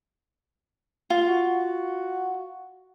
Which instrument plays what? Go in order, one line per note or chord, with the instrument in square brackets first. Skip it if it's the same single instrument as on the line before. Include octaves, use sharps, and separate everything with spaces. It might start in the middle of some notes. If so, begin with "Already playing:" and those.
[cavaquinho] F4
[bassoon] F#4